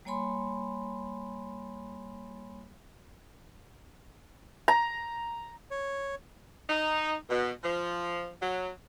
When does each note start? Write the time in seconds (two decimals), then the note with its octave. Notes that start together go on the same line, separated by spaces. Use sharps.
0.05 G3 A#3 C#5 G#5 B5 C6
4.68 A#5
5.71 C#5
6.69 D#4
7.30 B2
7.64 F3
8.41 F#3